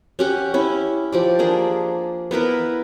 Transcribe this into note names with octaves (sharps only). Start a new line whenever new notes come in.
C#4 G4 F#5
C#4 E4
F3 G4 D5
A#3 D4 G#4
B3 E4 A#4 B4